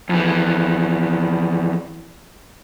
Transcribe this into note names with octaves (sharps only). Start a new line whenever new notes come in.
F2 E3